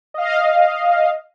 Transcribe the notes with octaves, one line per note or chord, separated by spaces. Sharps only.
D#5 F5